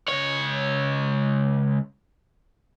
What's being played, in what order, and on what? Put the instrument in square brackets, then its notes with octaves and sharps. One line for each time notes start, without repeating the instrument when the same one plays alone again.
[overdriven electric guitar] C#2 C#5